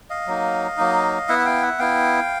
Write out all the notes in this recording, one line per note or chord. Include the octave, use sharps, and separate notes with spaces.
D#5 F5
F#3 A#3 D#4
F#3 A#3 D#4
B3 E4 E5 F#5
F5 G5
E5 F#5
B3 E4 F5 G5